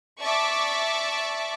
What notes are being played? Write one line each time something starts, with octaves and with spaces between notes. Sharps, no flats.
D5 E5 A5 C#6 D6